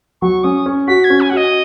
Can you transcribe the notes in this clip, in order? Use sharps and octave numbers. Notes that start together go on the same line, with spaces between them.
F#3 C#6
C#4 D#6
C#4
F#4 B6
G#6
C#4
G#5
F#4 F#5
D#5